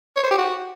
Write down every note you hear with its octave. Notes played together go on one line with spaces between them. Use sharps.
C#5
C5
G4
F#4